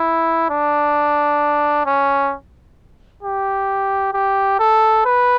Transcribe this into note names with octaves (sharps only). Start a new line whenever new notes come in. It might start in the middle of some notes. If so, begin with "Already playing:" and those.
Already playing: E4
D4
C#4
G4
G4
A4
B4